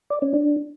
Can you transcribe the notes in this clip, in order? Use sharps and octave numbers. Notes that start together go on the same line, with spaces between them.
D5
C#4
D4